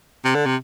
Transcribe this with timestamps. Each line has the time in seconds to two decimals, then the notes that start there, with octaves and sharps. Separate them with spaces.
0.25 C3
0.35 D3
0.46 C3